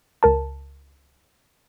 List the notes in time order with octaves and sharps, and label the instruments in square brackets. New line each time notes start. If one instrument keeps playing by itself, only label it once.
[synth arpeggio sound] C#2 A#4 A5